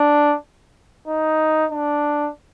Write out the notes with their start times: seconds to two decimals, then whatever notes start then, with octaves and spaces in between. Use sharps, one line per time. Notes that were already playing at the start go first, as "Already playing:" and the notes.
Already playing: D4
1.07 D#4
1.71 D4